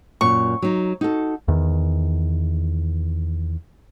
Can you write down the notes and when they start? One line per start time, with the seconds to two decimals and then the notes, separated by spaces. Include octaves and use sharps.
0.21 F#2 A#2 C#6
0.62 F#3 D#4
1.01 D#4 F#4 A4
1.48 E2 D#3